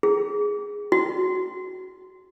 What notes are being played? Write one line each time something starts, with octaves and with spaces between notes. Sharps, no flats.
G#4
F#4